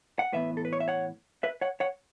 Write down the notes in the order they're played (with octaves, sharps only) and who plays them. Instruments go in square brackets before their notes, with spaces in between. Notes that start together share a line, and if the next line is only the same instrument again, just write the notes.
[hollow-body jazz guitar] F#5
A2 E3 B3 B4 E5
A4
B4
C#5
E5
C#5 F#5
B4 E5
C#5 F#5
C#5 F#5